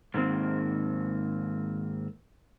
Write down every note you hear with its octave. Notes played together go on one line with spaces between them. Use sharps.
G#2 D#3 A#3 C4